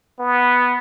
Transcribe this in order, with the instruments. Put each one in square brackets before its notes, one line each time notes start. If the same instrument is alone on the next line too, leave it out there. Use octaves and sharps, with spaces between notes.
[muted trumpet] B3